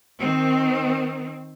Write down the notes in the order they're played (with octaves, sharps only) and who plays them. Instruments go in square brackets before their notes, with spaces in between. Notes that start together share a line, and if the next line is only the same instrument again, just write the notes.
[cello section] D#3 C4